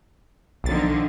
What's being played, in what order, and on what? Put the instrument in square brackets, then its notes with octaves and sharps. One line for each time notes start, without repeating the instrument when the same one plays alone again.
[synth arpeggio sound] B1 A6 [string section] D3 D#3 F3